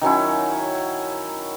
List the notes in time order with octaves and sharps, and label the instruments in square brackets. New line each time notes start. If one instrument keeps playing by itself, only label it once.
[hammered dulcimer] D#3 F#3 C#4 E4